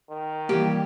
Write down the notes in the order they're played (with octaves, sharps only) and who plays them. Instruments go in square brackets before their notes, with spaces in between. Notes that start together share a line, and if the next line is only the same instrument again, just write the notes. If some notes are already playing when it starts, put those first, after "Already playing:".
[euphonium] D#3
[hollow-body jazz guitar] E3 G3 A#3 [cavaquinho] G4